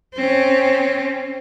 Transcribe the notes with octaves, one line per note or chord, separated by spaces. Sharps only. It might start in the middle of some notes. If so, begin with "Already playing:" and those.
C4 C#4